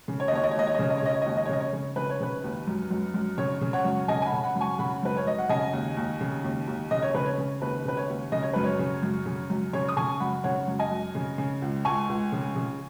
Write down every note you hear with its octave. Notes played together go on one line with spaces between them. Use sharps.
C#3
C#5
D#5
D#2 C#5
D#5
C#5
D#2 D#5
C#5
D#5
C#3 C#5
D#5
C#5
C#3 D#5
C#5
D#5
D#2 C#5
D#5
C#5
C#3 D#5
C#5
C#3
C#3 B4
C#5
C#3 B4
D#2
F#2
F#2
F#2
C#3 C#5
C#3
C#5 F#5
F#2
C#3 D#5 G#5
G#5
F#5 B5
C#3
F#5 B5
F#2
G#5 C#6
C#3 F#5 B5
F#2 B4
C#5
F#2 D#5
F#5
C#3 D#5 G#5
D#2
D#2
C#3
D#2
D#2
C#3 D#5
C#5
C#3 B4
C#5
C#3
D#2 B4
C#3 B4
C#5
D#2
C#3 D#5
C#5
F#2 B4
C#5
C#3
F#2
C#3
F#2
C#3 C#5
D#6
C#3 G#5 C#6
F#2 F#5 B5
C#3 C#5 F#5
F#2
D#5 G#5
F#2
C#3
C#3
C#2
C#2 G#5 C#6
C#2
C#3
C#3